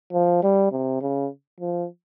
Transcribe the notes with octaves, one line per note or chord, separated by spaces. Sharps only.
F3
G3
C3
C#3
F3